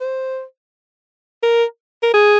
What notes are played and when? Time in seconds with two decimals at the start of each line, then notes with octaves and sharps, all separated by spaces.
0.01 C5
1.43 A#4
2.03 A#4
2.14 G#4